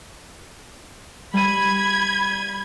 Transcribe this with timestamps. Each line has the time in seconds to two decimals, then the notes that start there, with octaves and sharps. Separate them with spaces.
1.34 G3 B5 G#6 D#7